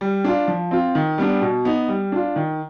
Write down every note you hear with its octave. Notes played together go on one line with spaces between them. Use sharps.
G3
D4 F4
F3
C4 F4
D#3
G3 B3 D4
B2
B3 D#4
G3
D4 F4
D#3